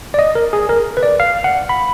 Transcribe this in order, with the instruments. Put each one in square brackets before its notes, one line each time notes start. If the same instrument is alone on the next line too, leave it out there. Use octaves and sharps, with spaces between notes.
[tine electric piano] D5
D#5
A#4
G#4
A#4
B4
D5
F5
F#5
B5